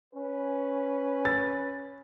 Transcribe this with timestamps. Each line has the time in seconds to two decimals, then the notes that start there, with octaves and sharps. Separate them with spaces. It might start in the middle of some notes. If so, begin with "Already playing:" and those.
0.14 C#4 B4
1.25 A6